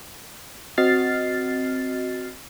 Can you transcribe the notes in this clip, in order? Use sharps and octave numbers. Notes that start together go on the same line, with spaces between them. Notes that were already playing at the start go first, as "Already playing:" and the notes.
C4 F#4 D#5 F6 A6 C7